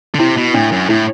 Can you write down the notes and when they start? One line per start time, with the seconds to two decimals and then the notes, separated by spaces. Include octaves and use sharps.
0.15 D3
0.20 C3 E4
0.37 B2
0.54 A2 D4
0.72 F#2
0.89 A2 E4